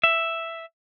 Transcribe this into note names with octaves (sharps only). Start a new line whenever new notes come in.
E5